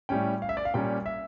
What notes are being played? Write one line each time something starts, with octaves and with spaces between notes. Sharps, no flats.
A2 G3 C#4 G5
F5
E5
D5
F5
A#2 G3 A#3 C#4 G5
E5